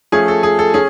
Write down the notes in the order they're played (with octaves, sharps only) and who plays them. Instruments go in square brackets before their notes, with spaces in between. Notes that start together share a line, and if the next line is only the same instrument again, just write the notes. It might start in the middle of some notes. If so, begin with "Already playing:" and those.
[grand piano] F3 A3 C#4 G#4
A4
G#4
A4
C#4 G#4